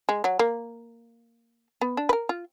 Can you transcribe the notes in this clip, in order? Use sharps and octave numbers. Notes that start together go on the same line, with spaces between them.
G#3
F#3
A#3
B3
D4
B4
A#4
F4